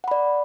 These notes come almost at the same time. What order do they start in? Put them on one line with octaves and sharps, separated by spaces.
F#5 B5 D5